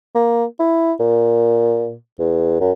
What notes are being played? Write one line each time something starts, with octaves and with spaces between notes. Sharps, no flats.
A#3
E4
A#2
E2
F#2